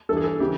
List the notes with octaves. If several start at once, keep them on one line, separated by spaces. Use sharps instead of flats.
G2 E3 G#4 A4
A4
C#3 E3 G4